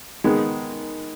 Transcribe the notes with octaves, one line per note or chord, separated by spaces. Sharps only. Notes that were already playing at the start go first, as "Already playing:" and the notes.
D#3 G#3 B3